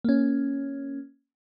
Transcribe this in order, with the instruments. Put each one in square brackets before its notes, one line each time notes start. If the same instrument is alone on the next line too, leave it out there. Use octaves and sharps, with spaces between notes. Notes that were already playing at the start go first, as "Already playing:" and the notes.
[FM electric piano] A#3 C#4